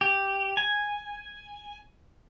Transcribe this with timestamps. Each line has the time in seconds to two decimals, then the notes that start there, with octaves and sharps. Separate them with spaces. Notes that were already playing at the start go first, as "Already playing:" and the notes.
0.01 G4
0.57 G#5